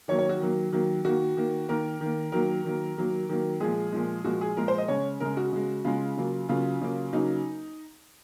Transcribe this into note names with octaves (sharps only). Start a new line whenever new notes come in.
D#3 F#3 A#3 C#5
C#5
F#4
D#3 F#3 A#3
D#3 F#3 A#3
D#3 A#3 F#4
D#3 A#3
D#3 A#3 A#4
D#3
A#3
D#3 F#3 A#3 A#4
D#3 F#3 A#3
D#3 F#3 A#3
D#3 F#3 A#3
A#2 F3 G#3 G#4
A#2 F3 G#3
A#2 F3 G#3 F#4
G#4
A#2 F3 G#3 A#4
C5
D#5
C#3 G#3 C#5
C#3 G#3 A#4
F#4
C#3 G#3
C#3 G#3 F4
C#3 F#3 A#3
C#3 F#3 A#3 F4
C#3 F#3 A#3
C#3 F#3 A#3 D#4